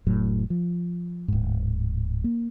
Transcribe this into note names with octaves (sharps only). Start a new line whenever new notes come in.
F1 A2 F#3
F3
D1 G#2
A#3